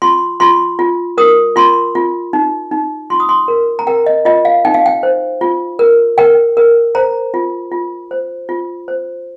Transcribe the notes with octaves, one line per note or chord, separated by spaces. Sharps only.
F4 C6
F4 C6
F4
A#4 D#6
F4 C6
F4
D#4
D#4
F4 C6
D#6
C6
A#4
A#5
A#4 G5
D#5
F4 D#5
F5
D#4 G5
F5
G5
C5
F4
A#4
A#4 G5
A#4
C5 A#5
F4
F4
C5
F4
C5